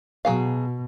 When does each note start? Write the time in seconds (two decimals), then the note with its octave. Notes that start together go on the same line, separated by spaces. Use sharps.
0.25 B2 F#3 G#4 F5